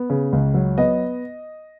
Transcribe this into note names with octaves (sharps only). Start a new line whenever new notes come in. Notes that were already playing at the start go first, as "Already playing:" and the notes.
Already playing: B3
C#3
C#2
F#3
B3 D#5